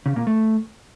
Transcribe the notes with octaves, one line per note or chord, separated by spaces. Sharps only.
C#3
A#2
A3